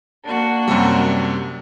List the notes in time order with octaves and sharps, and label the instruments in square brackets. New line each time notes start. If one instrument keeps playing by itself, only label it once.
[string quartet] A#3 D4 F#4
[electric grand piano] F#2 C3 G3